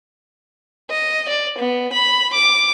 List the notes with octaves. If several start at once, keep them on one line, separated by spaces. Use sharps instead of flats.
D#5
D5
B3
B5
D6